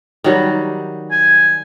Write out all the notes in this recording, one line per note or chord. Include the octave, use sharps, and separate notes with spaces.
D#3 F#3 G3
G#5